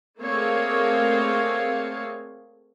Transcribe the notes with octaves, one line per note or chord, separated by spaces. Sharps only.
A3 A#3 C4 G#4 C#5 F5